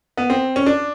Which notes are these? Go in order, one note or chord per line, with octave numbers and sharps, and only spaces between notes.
B3
C4
C#4
D4